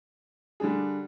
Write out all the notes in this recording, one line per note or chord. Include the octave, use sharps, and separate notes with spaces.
D3 G3 D4 G#4